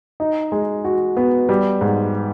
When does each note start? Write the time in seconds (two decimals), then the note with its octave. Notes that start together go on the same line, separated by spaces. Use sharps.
0.20 D#4
0.52 G#3
0.85 F#4
1.17 B3
1.49 G3
1.81 G#2